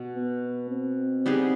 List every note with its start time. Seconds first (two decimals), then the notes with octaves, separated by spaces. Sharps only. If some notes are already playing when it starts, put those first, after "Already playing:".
Already playing: B2
0.16 B3
0.70 C4
1.26 G3 B3 D#4 G#4